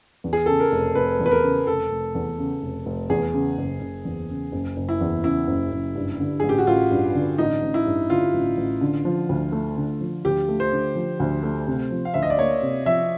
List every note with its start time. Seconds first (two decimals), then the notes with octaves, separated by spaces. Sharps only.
0.24 E2
0.33 G#4
0.46 C#3 A4
0.60 A#4
0.72 F1
0.95 F1 B4
1.19 E2
1.26 B4
1.31 A#4
1.43 C#3
1.67 F1 A4
1.91 F1
2.15 E2
2.38 C#3
2.62 F1
2.86 F1
3.10 E2 G#4
3.34 C#3
3.57 F#1
3.81 F#1
4.05 E2
4.29 C#3
4.52 F#1
4.76 F#1
4.89 E4
5.01 E2
5.24 C#3 E4
5.48 F#1
5.72 F#1
5.95 G2
6.20 D3
6.40 A1 G#4
6.49 G4
6.58 F#4
6.67 A1 F4
6.91 G2
7.15 D3
7.38 A1 D#4
7.62 A1
7.74 E4
7.86 G2
8.10 D3 F4
8.34 A1
8.57 A1
8.81 D3
9.05 F3
9.29 D2
9.52 A3
9.77 D3
10.01 F3
10.25 D2 G4
10.49 A3
10.60 C5
10.72 D3
10.95 F3
11.20 D2
11.43 A3
11.67 C3
11.91 F3
12.05 F5
12.14 D2 E5
12.23 D#5
12.30 D5
12.38 A#3 C#5
12.62 C3
12.86 F3 E5